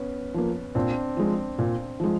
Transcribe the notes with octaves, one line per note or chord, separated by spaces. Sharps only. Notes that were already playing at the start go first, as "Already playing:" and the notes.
Already playing: B3 C#4
F3 A#3
A#2 C4 D4
F3 G#3
A#2
F3 G#3